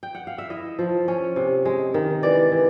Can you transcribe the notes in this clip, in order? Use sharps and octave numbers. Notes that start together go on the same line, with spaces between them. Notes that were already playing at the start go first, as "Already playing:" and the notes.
G5
F#5
F5
E5
E4 D#5
F3
C#4
C3
G#3
D#3
E3 D5
E3